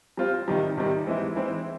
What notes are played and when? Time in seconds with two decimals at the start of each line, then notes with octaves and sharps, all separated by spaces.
0.17 G3 C4 F4
0.48 C3 D#3 G3
0.77 C3 D#3 G3
1.07 E3 G#3 C4 E4
1.36 E3 G#3 C4 E4